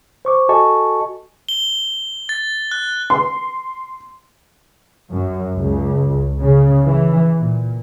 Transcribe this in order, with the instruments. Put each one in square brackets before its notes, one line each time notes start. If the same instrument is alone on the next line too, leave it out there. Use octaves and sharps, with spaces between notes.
[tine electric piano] C5 C#6 D6
F#4 A4 D#5 G#5 A5 C#6
[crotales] G7
A6
F#6
[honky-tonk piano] C6
[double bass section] F#2
C#2
C#3
E3
A#2